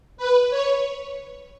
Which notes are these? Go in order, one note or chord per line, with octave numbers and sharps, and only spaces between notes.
B4
C#5